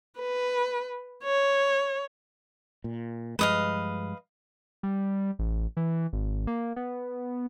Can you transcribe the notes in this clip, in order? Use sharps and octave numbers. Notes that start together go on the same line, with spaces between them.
B4
C#5
A#2
G2 F3 G#3 B4 D#5 F5
G3
A1
E3
G#1
A#3
B3